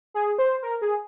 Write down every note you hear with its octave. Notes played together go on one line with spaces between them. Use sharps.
G#4
C5
A#4
G#4